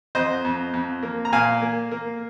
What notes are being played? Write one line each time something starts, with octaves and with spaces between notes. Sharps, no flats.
F2 C5 D#5
F2
F2
A#3
A#5
A#2 F5 G#5
A#3
A#3